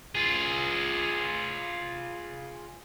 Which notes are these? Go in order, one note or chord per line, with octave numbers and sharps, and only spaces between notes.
F4 G#4